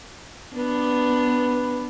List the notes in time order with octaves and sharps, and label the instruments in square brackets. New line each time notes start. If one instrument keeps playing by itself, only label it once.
[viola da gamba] B3 D4 [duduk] B4